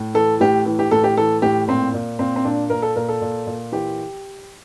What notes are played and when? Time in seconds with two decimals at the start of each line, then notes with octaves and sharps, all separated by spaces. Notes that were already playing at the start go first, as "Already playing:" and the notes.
Already playing: A2
0.14 E3 A4
0.40 A2 G4
0.66 E3
0.79 G4
0.91 A2 A4
1.04 G4
1.17 E3 A4
1.42 A2 G4
1.67 A#2 C4
1.94 A#2
2.19 A#2 C4
2.36 C4
2.45 A#2 D4
2.70 A#2 A#4
2.82 A4
2.96 A#2 A#4
3.09 A4
3.21 A#2
3.47 A#2
3.72 E3 G4